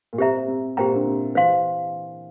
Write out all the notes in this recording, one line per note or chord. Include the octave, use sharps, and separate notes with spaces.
A#2
C3 G4 C5 E5 A#5
C3
A#2 G4 C5 G5 A#5
D3
C3
E3 C5 F5 C6